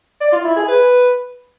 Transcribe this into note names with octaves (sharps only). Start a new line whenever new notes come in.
D5
F4
E4
G#4
B4